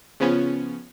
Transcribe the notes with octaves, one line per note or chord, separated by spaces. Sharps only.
C#3 F3 B3 C#4